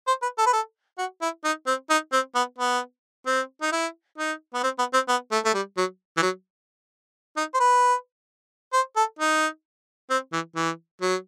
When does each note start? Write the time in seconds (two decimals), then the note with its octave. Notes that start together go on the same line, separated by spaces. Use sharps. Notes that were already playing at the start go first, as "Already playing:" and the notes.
0.07 C5
0.22 B4
0.38 A4
0.46 B4
0.53 A4
0.98 F#4
1.21 E4
1.44 D#4
1.67 C4
1.90 D#4
2.12 C4
2.35 B3
2.58 B3
3.26 C4
3.62 D#4
3.72 E4
4.18 D#4
4.54 B3
4.63 C4
4.79 B3
4.93 C4
5.08 B3
5.31 A3
5.45 A3
5.54 G3
5.77 F#3
6.17 E3
6.22 F#3
7.37 D#4
7.54 C5
7.60 B4
8.73 C5
8.96 A4
9.19 D#4
10.10 C4
10.33 E3
10.56 E3
11.01 F#3